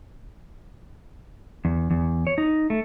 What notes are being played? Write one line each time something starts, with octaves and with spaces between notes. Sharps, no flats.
E2
E2
C#5
D#4
A3